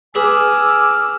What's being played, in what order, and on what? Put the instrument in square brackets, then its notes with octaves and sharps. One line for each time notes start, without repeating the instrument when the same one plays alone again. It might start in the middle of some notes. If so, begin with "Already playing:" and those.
[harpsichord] G#4 B4 [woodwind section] G#5 D6 [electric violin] E6 F6